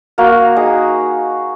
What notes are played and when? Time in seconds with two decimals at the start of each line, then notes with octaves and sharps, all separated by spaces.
0.18 A#3 F#4
0.56 D#4 G#4